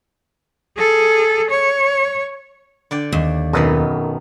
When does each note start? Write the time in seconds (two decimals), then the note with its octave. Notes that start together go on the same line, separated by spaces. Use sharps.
0.77 G#4 A4
1.51 C#5
2.91 D3 D5 G5
3.12 D#2
3.53 B1 F#2 D#3 B3 D#5